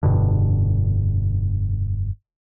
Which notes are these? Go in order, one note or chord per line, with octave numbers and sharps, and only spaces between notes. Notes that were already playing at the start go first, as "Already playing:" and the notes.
F1 G2 B2 D3